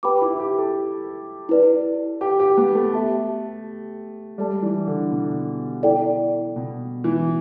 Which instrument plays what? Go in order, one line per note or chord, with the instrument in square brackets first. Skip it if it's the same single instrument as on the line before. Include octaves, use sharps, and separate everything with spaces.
[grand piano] G4 [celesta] B4 G5 B5 D6
[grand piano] E4
G4
A4
[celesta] E4 B4 D5
[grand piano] G4
G4
B3
A3
[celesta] G4 E5 A5
[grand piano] G3 [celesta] A4 D5 A5
[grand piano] E3
D3
B2
[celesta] E4 A4 D5 G5
[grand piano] B2
E3